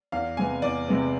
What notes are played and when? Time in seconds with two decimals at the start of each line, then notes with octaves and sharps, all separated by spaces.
0.12 E2 F5
0.37 C3 G#3 B3 G#5
0.62 E2 D5
0.88 C3 G#3 B3